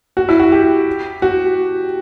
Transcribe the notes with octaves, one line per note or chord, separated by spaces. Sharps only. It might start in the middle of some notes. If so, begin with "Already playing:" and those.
F#4
E4
F#4
G4
F#4